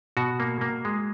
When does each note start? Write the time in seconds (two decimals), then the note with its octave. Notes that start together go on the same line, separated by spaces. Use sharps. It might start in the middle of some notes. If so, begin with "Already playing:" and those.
0.17 B2 F#4
0.40 A#3
0.61 A#3
0.85 G#3